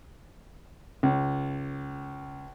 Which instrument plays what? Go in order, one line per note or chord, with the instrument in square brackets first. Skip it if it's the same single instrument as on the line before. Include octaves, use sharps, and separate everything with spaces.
[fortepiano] C#2